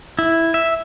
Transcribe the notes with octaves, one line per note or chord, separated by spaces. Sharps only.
E4
E5